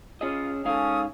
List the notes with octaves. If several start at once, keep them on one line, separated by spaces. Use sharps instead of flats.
C#4 F4 G#4 D#5 F5
G#2 C#4 A4 F5 G#5 D#6